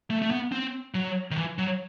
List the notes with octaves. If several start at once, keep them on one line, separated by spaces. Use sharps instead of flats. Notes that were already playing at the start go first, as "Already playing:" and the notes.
A3
A3
B3
C4
F#3
D#3
E3
F#3